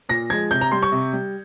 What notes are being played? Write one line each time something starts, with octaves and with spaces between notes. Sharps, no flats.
A#2 A#6
F3 G#3 G#6
C3 G6
A#5
G3 C6
C#6
C3
G3